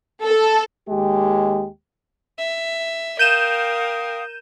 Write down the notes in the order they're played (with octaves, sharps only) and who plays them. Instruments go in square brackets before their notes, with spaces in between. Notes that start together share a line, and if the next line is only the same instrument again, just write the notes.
[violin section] A4
[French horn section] D#2 G#3 G4
[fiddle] E5
[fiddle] A#4 [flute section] F5 G5 D#6 [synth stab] G6 D#7 E7